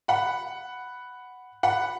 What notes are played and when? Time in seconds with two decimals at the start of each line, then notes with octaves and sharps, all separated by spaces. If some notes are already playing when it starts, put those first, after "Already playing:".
0.08 F#5 B5
1.63 F#5 B5